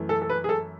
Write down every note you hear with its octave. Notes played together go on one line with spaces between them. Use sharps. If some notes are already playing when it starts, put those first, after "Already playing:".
Already playing: F#2 E3 A3
A4
A4
B4
G#4
A4